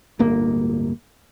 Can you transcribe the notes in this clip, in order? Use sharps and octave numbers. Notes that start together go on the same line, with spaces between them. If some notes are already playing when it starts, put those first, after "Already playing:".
D1 G1 A#3